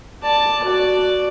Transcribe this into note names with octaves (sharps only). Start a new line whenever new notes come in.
D5 A5
F#4 D5